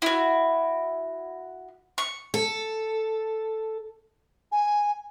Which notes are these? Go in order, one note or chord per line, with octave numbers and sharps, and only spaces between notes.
E4 F#4
C#6
A4
G#5